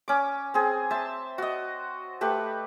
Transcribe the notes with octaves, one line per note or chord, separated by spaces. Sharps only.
C#4 D6
C4 G#4
C5 E5 A5
F#4 D#5
A3 G4 B4